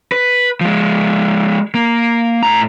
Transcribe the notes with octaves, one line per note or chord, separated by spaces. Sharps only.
B4
F3 G#3
A#3
A2 A#5